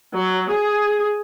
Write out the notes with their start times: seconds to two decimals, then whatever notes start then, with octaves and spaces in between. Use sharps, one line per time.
0.16 F#3
0.52 G#4